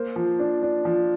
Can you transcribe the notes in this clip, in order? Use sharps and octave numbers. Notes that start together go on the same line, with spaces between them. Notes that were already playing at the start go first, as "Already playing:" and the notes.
Already playing: A#3 C5
F3
D4
D4
F3